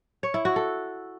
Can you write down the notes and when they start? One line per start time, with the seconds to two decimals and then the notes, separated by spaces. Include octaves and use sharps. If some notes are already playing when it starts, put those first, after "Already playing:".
0.23 C#5
0.34 E4
0.45 F#4
0.56 A4